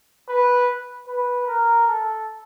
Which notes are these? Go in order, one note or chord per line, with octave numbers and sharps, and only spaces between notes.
B4
B4
A#4
A4